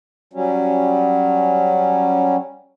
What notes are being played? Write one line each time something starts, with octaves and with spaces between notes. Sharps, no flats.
F#3 G3 C#4